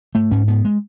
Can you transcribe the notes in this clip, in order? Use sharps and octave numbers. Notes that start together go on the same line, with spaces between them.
G#2 A3
G#2 C#4
G#2 B3
G#3